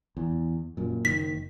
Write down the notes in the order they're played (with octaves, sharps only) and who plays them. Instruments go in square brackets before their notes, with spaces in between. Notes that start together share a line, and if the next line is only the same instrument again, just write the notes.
[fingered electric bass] E2
F#2 A#2
[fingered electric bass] F#1 D#3 [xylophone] B6